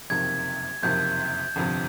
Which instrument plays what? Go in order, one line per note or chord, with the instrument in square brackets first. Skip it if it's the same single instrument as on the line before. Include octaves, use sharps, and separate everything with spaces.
[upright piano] F#1 F2 C3 D#3 [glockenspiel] G#6
[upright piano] F#1 F2 C3 D#3 [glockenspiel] G6
[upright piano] G1 F2 C3